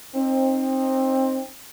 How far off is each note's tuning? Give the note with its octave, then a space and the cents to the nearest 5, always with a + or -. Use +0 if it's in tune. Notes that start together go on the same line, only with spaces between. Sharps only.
C4 +20 D#4 -10